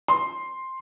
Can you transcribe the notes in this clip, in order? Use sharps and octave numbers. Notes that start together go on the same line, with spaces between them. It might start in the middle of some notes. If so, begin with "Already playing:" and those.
C6